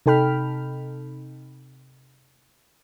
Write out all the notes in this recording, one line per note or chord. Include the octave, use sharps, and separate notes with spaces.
C3 D#4 A4 G5 B5 F6